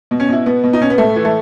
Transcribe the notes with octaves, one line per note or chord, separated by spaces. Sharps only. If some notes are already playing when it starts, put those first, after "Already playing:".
B2
C#4
B2 E4
B2 B3
B2
D#4
B2 C#4
B3
A2 A3
E3
A3